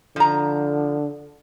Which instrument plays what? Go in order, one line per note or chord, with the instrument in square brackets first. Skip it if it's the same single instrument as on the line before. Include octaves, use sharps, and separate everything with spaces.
[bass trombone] D3 [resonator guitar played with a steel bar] F3 A#5